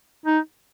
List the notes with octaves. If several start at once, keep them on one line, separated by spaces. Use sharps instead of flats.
D#4